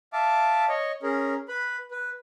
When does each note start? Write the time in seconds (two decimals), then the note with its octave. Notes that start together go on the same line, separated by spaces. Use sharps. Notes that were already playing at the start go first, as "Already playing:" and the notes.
0.13 E5 F5 A5 D6
0.68 C#5 D#5
1.03 C#4 G#4 A#4
1.48 B4 B5
1.91 B4